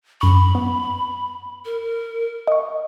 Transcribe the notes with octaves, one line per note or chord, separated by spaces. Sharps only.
F#2 B5 C#6
B3
A#4
D#5 C#6